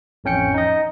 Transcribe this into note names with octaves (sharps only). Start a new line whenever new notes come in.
A1 F2 C#4 G5 C#7
D#4 D#5